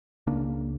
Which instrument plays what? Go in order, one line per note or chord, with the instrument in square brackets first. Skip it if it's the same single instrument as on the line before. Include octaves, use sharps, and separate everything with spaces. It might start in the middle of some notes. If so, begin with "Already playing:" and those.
[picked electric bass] C#2 C#3 A#3 D4